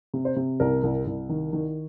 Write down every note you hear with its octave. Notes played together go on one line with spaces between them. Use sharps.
C3
C5
C3
C2 A#4
C2
C2
D#3
D#3